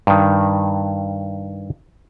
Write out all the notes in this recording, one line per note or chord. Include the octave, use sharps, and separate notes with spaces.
G2 D#3